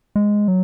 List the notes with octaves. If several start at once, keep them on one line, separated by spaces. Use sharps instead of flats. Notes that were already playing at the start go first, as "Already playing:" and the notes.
G#3
F#3